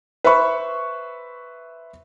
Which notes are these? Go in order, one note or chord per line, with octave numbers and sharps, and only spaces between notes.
B4 C5 E5 B5 C#6